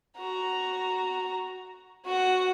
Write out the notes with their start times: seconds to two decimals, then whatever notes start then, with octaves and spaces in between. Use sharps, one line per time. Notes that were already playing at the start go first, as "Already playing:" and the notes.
0.17 F#4 A#5
2.05 F#4 F#5